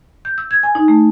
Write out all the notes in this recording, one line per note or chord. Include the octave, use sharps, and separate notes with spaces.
G6
E6
G#6
G#5
D#4
A3